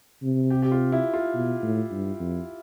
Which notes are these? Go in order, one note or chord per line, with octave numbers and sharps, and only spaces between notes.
C3
G4
G4
F4
E4
F4
B2
A2
G2
F2